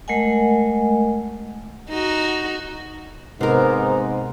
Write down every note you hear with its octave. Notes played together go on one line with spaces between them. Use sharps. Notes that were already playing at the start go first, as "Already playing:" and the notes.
G#3 A3 A#4 D#5 F#5 G#5
D#4 F#4
G#2 C3 B3 D#4 A#4 C5